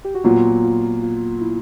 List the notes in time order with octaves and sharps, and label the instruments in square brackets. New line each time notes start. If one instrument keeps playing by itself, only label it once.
[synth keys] G4
F#4
[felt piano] A#2 F#3 B3 [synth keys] F4
[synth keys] F4
F4
E4